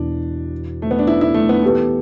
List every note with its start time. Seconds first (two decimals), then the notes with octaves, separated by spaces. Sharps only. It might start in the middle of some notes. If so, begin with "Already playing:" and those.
Already playing: E2 B2 D4
0.82 A3
0.91 B3
0.99 D4
1.07 E4
1.21 E4
1.34 A3
1.49 B3
1.62 E3 B3 G4 A4 B4